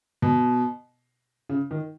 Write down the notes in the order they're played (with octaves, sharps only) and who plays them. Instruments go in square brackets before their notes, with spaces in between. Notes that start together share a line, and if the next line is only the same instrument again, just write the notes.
[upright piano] B2
C#3
D#3